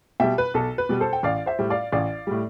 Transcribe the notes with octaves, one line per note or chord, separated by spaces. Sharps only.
B2 G3 E5 G5
B4
B1 A4
B4
B2 G3
A4 C5
G5
A1 D5 F5
C5 E5
A2 G3
D5 F5
A1 D5 F5
A2 G3